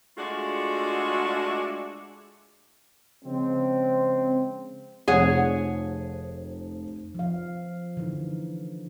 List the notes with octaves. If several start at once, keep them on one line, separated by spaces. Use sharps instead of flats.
G#3 A3 D4 F4 F#4
C#3 F3 G#3 C4
F1 F3 F4 G#4 C#5 F#5
F3 F5
D3 E3 D#4